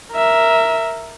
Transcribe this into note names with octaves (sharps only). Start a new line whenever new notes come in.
A#4 E5